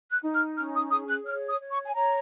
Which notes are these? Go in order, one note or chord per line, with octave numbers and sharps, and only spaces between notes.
F#6
D#4
F6
C#4 F6
D#6
G#4 D#6
F#6
C#5 F6
D#6
C#5
C#6
G#5
C#5 A#5